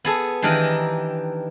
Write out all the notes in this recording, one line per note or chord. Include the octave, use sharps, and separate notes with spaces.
B3 G#4 A4
D#3 E3 D4 D#4 G4 A#4